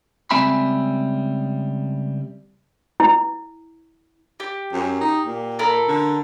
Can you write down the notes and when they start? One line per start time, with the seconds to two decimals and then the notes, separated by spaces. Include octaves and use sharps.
0.31 C#2 G3 C4 E5 G#5 B5
3.00 E4
4.40 G4
4.73 F#2
5.00 D#4
5.24 A#2
5.59 A4 A#4 B5
5.88 D3